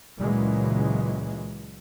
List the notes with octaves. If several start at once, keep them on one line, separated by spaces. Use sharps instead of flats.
C#2 A#2 C#3 E3 F#3 G#3